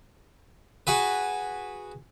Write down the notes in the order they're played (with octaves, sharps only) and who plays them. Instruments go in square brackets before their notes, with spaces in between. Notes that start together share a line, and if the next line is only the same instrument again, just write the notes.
[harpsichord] F#4 G#4 B4